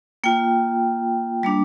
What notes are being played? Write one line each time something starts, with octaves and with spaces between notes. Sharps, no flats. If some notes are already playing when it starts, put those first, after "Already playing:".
A#3 F4 G5
G3 A#3 D4